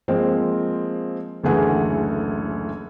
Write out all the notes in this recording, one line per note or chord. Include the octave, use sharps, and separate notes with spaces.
F3 G#3 A#3 C4
F#1 D2 E3 A3 G#4 F#5